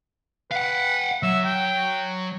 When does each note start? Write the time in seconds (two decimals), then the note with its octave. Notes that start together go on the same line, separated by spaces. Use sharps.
0.51 B4 F5 F#5
1.23 F#3 E5
1.45 G5